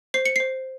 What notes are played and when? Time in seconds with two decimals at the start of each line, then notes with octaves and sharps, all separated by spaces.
0.14 C5 C7
0.25 C#7
0.36 C5 C7